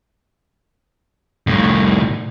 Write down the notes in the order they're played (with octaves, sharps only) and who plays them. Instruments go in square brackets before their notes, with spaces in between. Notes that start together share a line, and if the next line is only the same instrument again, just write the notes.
[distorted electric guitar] C2 A2